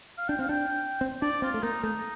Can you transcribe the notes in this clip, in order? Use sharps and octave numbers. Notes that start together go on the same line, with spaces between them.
F5
D4 G5
C4 F5
D4 G5
C4
D4 D5
C4 F4
A3
A#3 D#4
A3 D#4